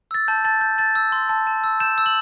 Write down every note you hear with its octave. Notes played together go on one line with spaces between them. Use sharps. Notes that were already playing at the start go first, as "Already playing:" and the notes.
E6 A6
A5 G6
A5 A6
G6
A5 A6
E6
C6
A5
A5
E6
G6 E7
E6
F#7